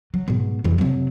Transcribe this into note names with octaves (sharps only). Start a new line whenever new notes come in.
F#3
G#2 B2
F2 E3
C3 F#3